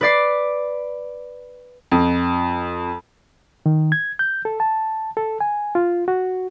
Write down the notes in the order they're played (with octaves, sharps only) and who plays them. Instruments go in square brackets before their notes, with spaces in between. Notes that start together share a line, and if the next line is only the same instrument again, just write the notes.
[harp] B4 D5 C7
[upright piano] F2
[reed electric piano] D#3
G#6
G6
A4
A5
A4
G#5
F4
F#4